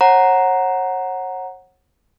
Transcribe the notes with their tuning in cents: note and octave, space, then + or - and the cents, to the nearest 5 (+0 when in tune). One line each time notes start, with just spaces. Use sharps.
C#5 -40 F#5 +0 A#5 +0